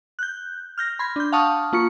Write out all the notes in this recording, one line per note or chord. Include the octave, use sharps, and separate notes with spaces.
F#6 G6
F6 G6 A#6
B5 C6 G#6
D4 G6
F5 F#5 A5 C#6 D#6 F6
A#3 F4 C#6 C#7